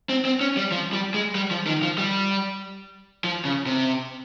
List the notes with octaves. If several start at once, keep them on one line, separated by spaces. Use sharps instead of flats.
C4
C4
C#4
G3
F3
G3
G#3
G3
F3
D#3
F3
G3
F3
C#3
C3